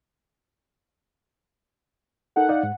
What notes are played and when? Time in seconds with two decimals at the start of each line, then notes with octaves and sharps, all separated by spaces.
2.36 D#4 A4 A#4 F#5
2.49 D#4 D5 F5
2.63 G#2